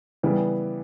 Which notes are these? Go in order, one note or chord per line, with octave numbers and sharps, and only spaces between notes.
C#3 E3 G3 B3